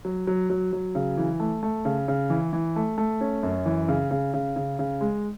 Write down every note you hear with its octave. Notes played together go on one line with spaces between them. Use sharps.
F#3
F#3
F#3
F#3
C#3
E3
A3
A3
C#3
C#3
E3
E3
A3
A3
C#4
F#2
E3
C#3
C#3
C#3
C#3
C#3
G#3